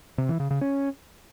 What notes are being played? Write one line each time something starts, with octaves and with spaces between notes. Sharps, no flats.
C3
E3
C#3
C#3
C#4